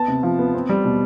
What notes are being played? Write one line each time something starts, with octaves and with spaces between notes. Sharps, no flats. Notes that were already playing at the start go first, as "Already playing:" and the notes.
Already playing: B3 A5
C3
F3
B3
C4
G3
B2